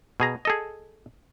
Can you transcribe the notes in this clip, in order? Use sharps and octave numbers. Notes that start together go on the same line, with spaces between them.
B2 G#4 A#5
G#4 A4 D#5